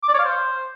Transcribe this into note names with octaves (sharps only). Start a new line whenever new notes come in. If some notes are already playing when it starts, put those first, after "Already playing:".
D6
D5
C#5
F5
C5